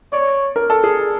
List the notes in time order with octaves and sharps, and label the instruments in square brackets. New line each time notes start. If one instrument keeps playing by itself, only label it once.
[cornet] C#5 [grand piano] D5
[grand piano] A#4
A4
G#4